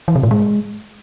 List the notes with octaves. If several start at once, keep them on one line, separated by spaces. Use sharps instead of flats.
E3
C3
A2
G#3